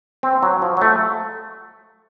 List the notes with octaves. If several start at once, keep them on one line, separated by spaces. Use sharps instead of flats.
C4
F#3
F3
F#3
A3